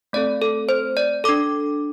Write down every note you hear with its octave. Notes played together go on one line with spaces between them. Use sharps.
A3 C4 A4 D5
A4
C5
D5
D4 A4 D6